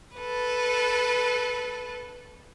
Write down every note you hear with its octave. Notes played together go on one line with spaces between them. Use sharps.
A4 B4